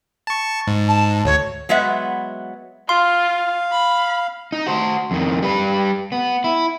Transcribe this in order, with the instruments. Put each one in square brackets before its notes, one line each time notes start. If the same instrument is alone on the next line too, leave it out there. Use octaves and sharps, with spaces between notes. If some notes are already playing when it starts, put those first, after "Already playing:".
[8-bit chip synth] A5 C#6
G#2
[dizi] A5
[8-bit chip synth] D2 [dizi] C#5
[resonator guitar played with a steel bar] F#3 G#3 B3 E5 F#5
[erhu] F4 [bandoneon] F5 [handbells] C6
[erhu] B5
[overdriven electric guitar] D#4
F#4 C5
F2 D#3
G3 B4
B3
E4